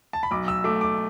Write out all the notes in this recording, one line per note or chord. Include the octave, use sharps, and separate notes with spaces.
A5
B5
B1 D6
E6
A3 D6
D6